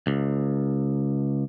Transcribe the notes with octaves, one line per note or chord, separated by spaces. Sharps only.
C#2